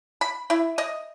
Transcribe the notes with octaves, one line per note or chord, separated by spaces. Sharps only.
B5
E4
D#5